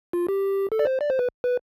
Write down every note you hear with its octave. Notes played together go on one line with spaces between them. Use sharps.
F4
G4
A4
D5
C5
D5
C5
B4
B4